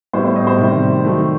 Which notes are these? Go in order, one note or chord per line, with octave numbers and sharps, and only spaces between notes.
A2 G3 B3 C5
C5
D#5
C5
C3 D#3 G3
D#3 F#3 A3